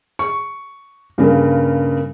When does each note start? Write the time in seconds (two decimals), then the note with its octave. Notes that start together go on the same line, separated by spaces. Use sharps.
0.19 C#6
1.18 G2 C#3 A#3